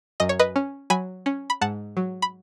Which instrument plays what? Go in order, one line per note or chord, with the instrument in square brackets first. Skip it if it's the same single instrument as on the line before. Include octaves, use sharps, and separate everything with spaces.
[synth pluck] F#2 D#5
C#5
B4 D#5
C#4
F#3 G#5 B5
C#4
B5
G#2 F#5 A5
F#3
B5